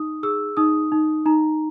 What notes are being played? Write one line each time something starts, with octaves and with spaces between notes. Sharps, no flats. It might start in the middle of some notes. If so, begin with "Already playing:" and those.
Already playing: D#4 D#6
G#4 E6
D#4 D#6
D#4
D#4 A#5